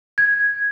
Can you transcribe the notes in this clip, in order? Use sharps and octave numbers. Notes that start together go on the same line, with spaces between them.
G#6